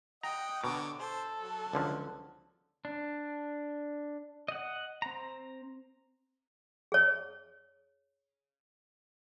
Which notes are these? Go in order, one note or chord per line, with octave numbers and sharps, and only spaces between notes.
D#5 F#5 G5 A#5
B2 D3 C#5 A#5 D6
A4 C5
F#3
C#2 D3 F3
D4
D#5 F#5
C4 A#5
G#4 C#5